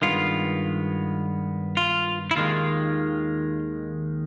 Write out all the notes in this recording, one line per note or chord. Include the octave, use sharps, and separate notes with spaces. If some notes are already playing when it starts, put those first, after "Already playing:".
G2 D#3 G#3 B3 F4
F4
E4
D#2 D#3 G#3 F4